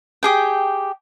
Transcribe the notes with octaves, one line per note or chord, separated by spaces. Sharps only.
G4 G#4 G5